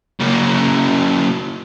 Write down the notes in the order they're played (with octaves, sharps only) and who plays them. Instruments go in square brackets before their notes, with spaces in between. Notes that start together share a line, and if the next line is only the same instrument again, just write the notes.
[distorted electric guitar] C#3 A#3